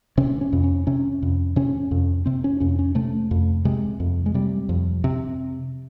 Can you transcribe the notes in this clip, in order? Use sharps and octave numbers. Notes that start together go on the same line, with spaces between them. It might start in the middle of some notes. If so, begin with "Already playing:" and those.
C3 C#4
C#4
F2
C#4
C3 C#4
F2
C3 C#4
F2
C3 C4
C#4
F2 C#4
C#4
C3 A3
F2
C3 G#3
F2
G#3
C3 G3
F2
C3